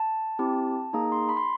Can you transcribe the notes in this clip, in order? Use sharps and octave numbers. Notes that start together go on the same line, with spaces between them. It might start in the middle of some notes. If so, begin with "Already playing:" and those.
Already playing: A5
C4 E4 G4
A#3 D#4 G#4 A#5
C6
B5
C6